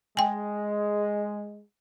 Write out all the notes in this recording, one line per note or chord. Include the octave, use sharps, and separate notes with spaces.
G#3 G5 G#5